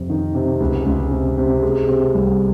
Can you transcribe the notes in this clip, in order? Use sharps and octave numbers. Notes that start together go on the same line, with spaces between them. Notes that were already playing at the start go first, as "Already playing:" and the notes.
Already playing: F2 C3
D#3
C3
C#2
C#2
C3
C3
G#3
C3
C2